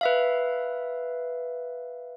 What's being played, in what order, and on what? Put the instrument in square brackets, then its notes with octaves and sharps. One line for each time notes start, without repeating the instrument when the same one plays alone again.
[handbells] B4 E5 F5